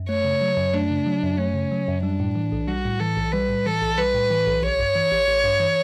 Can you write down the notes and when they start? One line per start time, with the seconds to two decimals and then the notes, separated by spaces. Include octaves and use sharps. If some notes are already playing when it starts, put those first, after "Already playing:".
Already playing: F#2
0.09 A3 C#5
0.25 C#3
0.41 F#3
0.58 F#2
0.74 A3 D4
0.90 C#3
1.06 F#3
1.23 F#2
1.38 A3 C#4
1.54 C#3
1.72 F#3
1.88 F#2
2.03 G3 D4
2.20 A2
2.36 E3
2.52 B1
2.68 G3 F#4
2.85 A2
3.00 E3 A4
3.17 B1
3.33 G3 B4
3.49 A2
3.66 E3 A4
3.82 B1
3.98 G3 B4
4.15 A2
4.30 E3
4.47 B1
4.63 A1 C#5
4.80 G2
4.96 E3
5.12 A1
5.28 A1
5.44 G2
5.60 E3